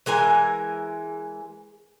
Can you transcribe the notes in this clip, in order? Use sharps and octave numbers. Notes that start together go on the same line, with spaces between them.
E3 G#3 A#4 G#5